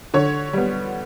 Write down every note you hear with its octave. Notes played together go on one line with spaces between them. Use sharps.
D3 C#5
G3 B3